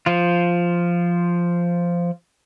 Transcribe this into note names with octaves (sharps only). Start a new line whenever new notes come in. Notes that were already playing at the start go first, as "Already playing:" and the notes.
F3 F4